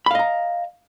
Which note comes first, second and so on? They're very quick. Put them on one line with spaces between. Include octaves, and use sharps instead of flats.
B5 F5 D#5 A#5